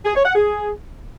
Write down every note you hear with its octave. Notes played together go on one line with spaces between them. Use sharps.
G#4
C#5
F#5
G#4